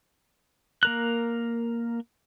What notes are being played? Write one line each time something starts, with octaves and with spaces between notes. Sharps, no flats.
A#3 A#4 F#6